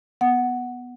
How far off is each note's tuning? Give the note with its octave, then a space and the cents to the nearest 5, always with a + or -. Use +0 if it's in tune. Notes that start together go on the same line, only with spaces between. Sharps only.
B3 +0 F#5 +0